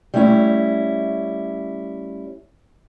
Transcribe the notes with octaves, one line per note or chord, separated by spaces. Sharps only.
G3 A3 C#4 E4 C#5